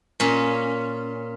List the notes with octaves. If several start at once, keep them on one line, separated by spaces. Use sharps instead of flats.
A#2 C#4